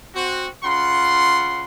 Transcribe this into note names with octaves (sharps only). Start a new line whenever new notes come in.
C4 F#4
C#3 F4 F#5 C6